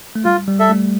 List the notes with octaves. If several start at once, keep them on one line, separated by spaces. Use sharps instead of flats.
A3
G3 F4
G3
A4 E5
A3